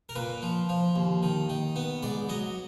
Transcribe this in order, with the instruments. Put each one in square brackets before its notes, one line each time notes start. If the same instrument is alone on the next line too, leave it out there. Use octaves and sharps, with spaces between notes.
[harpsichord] A#4
A#2 B4
F3
F3
D#2
D#3
D#3
B3
G#2 D5
F#3 D#5